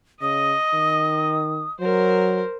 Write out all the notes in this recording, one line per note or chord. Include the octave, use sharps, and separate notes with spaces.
C#3 D#5 D#6
D#3
F#3 A#4 C5